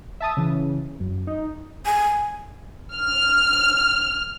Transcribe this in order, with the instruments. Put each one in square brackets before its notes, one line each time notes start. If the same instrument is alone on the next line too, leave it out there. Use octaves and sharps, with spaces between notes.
[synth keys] E5 A5 D#6
C#3 E3
F#2
D#4
[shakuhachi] G#5
[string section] F6